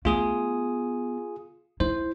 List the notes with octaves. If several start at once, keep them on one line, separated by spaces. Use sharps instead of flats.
A3 B3 F4 G#4 D#6
E4 C5